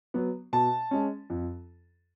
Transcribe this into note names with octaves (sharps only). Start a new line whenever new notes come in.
F#3 B3
B2 A5
G#3 C#4
F2